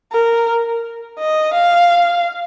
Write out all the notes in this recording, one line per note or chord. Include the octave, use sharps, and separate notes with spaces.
A#4
D#5
F5